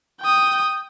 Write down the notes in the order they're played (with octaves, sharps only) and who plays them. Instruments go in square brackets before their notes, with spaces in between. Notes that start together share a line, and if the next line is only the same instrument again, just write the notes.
[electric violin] G5 D#6